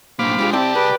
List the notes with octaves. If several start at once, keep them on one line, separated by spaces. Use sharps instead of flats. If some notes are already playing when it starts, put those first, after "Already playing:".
B1 A2 A#3 D4 C5 F5 B5 D6
G3 G#3 D4 F4 G#4
C2 C4 E4 G4 D5 E5 A5
G#4 B4